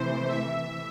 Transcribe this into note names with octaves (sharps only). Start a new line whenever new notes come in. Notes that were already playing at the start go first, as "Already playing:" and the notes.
Already playing: C3 E3 A3 C5
E5